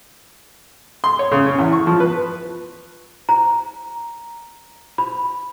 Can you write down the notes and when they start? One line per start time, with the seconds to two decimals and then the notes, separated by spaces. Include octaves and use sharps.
1.04 C6
1.19 C#5
1.32 C#3
1.46 C#4
1.59 E2
1.72 C#6
1.87 F3
2.00 B4
3.29 A#5
4.98 B5